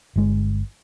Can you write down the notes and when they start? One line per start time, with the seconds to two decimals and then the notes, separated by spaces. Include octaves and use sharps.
0.16 G1 G#3